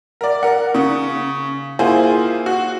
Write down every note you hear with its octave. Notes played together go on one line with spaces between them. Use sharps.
A#4 D5
A#4 F#5
C#3
A#3 E4 F4 G#4 C5
F#4